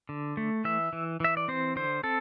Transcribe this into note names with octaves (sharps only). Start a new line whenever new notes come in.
D3
A3
E3 E5
E3
E3 E5
D5
C4 C5
D3 C5
C4 A4